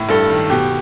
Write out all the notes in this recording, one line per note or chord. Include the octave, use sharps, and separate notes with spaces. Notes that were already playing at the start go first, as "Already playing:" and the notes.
Already playing: A2
G2 A4
D#3
B2 G4